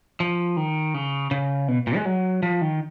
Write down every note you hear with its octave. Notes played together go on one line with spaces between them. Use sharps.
F3
D#3
C#3
C#3
B2
A#2
G#3
F#3
F3
D#3